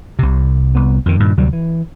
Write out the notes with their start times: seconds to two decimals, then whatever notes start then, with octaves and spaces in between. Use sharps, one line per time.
0.19 C2 C3
0.75 C2 B3
1.06 F2 D#3
1.20 G2 A#2 D#3
1.37 D2 C3 F#3 G3
1.53 E3